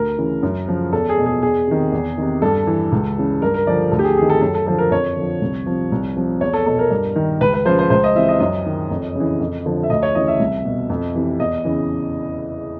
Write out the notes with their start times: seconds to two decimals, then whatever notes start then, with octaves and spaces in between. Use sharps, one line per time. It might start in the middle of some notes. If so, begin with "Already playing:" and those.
Already playing: D2 A#4
0.18 C#3 E3
0.43 F#2
0.68 C#3 F3
0.92 E2 A4
1.09 G#4
1.18 B2
1.26 G#4
1.42 E2 G#4
1.67 C3 D#3
1.92 E2
2.18 C3 D#3
2.42 G2 A4
2.67 E3
2.92 C#2
3.18 C#3 E3
3.42 G2 A#4
3.54 A#4
3.67 D3 F3 D5
3.91 D2 A4
3.99 G4
4.04 G#4
4.17 C3 D#3 G#4
4.30 A4
4.41 F#2 A4
4.55 A4
4.66 D3 F3 A4
4.78 A#4
4.91 F2 C#5
5.16 D3 F3
5.42 C2
5.66 C3 F3
5.92 C2
6.16 C3 F3
6.41 E2 C#5
6.53 A4
6.66 B2 A4
6.79 A#4
6.90 G2
7.16 D#3
7.41 C#2 B4
7.54 B4
7.66 C#3 F3 C5
7.79 C5
7.90 C#2 C5
8.04 D#5
8.15 C3 E3 E5
8.29 D#5
8.40 F#2 D#5
8.66 D#3
8.91 F2
9.15 C#3
9.20 E3
9.40 F2
9.66 D3 F3
9.83 E5
9.90 D2 D#5
10.03 C#5
10.15 C#3 E3 D#5
10.28 E5
10.39 C2
10.65 B2
10.90 F2
11.15 C3 E3
11.39 E2 D#5
11.64 C#3 E3